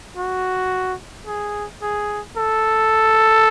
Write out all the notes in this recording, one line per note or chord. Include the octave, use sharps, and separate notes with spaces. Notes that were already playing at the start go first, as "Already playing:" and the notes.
F#4
G#4
G#4
A4